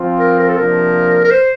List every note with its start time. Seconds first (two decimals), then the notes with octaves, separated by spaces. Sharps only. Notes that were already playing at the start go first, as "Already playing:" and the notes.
Already playing: F3 C4 F4
0.20 A#4
0.39 A#4
0.49 A4
0.57 C3 F3 A#3 D4 A#4
1.24 A#4
1.32 C5